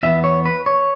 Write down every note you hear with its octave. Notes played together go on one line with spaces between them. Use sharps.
E2 E3 B3 E5
C#5
B4
C#5